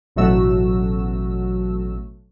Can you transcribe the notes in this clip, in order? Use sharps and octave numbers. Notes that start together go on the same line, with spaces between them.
A1 B2 F#3 A3 F#4 E6